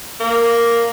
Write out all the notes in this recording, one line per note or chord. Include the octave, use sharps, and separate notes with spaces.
A#3